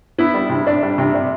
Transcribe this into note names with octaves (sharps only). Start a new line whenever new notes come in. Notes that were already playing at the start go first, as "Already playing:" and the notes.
B3 E4
G3
C3
D4
G3
C3
D4